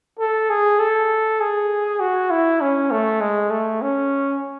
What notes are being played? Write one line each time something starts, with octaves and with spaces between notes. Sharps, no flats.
A4
G#4
A4
G#4
F#4
E4
C#4
A3
G#3
A3
C#4